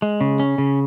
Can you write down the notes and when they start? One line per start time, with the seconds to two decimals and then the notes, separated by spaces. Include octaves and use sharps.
0.02 G#3
0.21 C#3
0.40 C#4
0.58 C#3